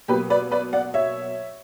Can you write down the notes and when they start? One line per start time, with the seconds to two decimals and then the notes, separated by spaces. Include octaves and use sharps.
0.08 B2 F#3 A#3 G4 B4
0.30 B4 D5
0.51 B4 D5
0.73 D5 F#5
0.94 C#5 E5